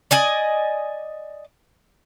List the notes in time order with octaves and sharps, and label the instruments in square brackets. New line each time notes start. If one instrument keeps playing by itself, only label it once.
[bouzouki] D5 D#5 G#5